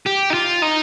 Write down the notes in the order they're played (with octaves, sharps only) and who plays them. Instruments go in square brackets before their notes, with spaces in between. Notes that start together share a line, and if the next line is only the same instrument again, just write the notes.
[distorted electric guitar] G4
D#4
F4
D#4